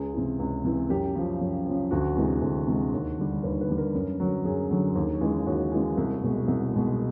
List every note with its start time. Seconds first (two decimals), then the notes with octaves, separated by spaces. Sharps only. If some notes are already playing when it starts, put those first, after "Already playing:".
Already playing: C#2 G#4
0.14 C3 E3
0.39 C#2
0.65 C3 E3
0.89 F#2 G4
1.15 C#3 F3
1.41 F#2
1.66 C#3 F3
1.91 D2 F#4
2.16 C3 E3 G#3
2.42 D2
2.67 C3 E3 G#3
2.93 D#2
3.18 D3 G3
3.43 D#2 B4
3.61 B4
3.69 D3 G3
3.78 A#4
3.94 F#2
4.20 D3 F#3
4.45 F#2 G#4
4.71 D3 F#3
4.95 D#2
5.21 C#3 E3 G#3
5.46 D#2 F#4
5.72 C#3 E3 G#3
5.97 C2
6.23 B2 G#3
6.48 C2
6.73 B2 G#3